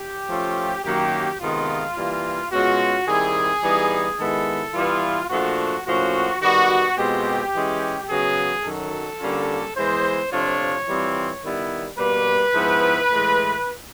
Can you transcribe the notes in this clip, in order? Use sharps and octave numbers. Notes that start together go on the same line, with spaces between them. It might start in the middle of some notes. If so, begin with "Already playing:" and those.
Already playing: G4
F3 A3 C#4 F4
F#2 D#3 F#3 A#3 G4
C3 D#3 G#3 B3 F4
E3 G3 A#3
B2 G#3 C#4 F4 F#4
D#3 G3 C4 E4 G#4
E3 G3 B3 D#4
D#3 G#3 B3 E4 A4
E3 G3 B3 E4 F4
A#2 F3 A3 D4 F#4
A2 F3 A#3 C#4 F#4
D#3 G3 B3 F#4
B2 G#3 C4 F4 G4
E3 G#3 C#4
C#3 F#3 B3 G#4
F#2 D#3 F#3 A4
D3 G3 A#3 C#4 F4
E3 G#3 B3 E4 C5
C3 F3 A3 D4 F4 C#5
E3 G3 C4 F4
D#3 G3 B3 E4
B2 G3 A#3 B4
G#2 F3 G#3 B3 E4
A2 E3 G#3